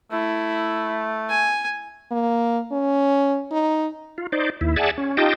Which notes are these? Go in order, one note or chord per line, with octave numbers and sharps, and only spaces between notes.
A3 E4
G#5
A#3
C#4
D#4
F4
D#4 C5 D5
D#2 E4
G#4 D5 E5 F#5 G#5 A5
C#4
D#4 F4 G4 D#5 G5 A5